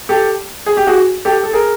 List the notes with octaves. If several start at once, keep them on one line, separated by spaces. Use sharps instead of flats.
G4 A4
G#4
G4
F#4 G#4
G4 A4
A4
G#4 A#4